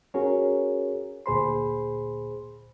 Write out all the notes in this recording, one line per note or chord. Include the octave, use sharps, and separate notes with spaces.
C#4 F#4 G#4 A#4 C#5
D2 A#2 G#4 C5 B5 C6